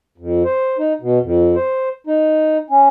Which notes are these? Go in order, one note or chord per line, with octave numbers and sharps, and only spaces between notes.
F2
C5
D#4
B2
F2
C5
D#4
C#4